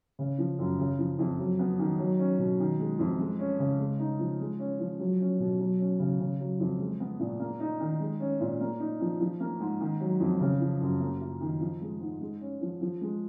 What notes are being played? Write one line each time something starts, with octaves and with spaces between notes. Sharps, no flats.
C#3
F3
F#2
C#3
F3
F2
F#3
B3
D#3
F#3
C#4
B2
D#3
G#3
F2
G#3
C#4
C#3
G#3
D#4
F3
G#3
C#4
F3
F#3
C#4
B2
F#3
C#4
C#3
C#3
F#3
F2
G#3
B3
A#2
A#3
D#4
D#3
G#3
C#4
A#2
A#3
D#4
F3
F3
A#3
G#2
D#3
F#3
F2
C#3
F3
F#2
A#3
F4
D#3
F3
G#3
G#2
G#3
C#4
F3
F3
G#3